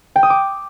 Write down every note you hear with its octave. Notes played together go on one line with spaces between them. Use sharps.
G5
D#6
D6